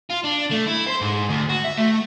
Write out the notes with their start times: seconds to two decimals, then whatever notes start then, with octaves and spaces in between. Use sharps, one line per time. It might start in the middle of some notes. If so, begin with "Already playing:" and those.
0.10 F4
0.25 D4
0.52 A3
0.67 E4
0.88 C5
1.01 G#2
1.30 D2
1.49 F#4
1.64 E5
1.77 A3